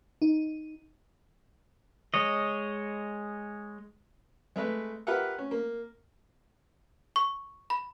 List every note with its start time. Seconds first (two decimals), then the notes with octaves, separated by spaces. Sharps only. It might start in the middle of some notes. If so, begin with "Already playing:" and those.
0.22 D#4
2.14 G#3 C#5 D#5
4.56 G#3 A3 B4
5.07 F4 G4 A#4 B4 E5 F#5
5.38 C#4
5.51 A#3
7.16 C#6
7.70 B5